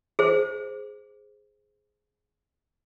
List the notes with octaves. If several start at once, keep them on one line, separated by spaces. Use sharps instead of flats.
G#4 C5